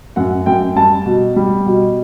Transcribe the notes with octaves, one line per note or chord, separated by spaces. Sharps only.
F#2 F#5
F#2 G5
G3 A5
B2
G3
B2